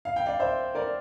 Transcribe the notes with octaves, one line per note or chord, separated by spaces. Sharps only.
F5
G5
D5 F5
C5 E5
A#4 D5